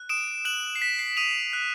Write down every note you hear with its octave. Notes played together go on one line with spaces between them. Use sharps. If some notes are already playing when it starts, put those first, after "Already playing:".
Already playing: F#6
D#6 D7 E7
F#6 E7 F#7
C7
F#6 B6
C7
D#6 D#7 F7
F#6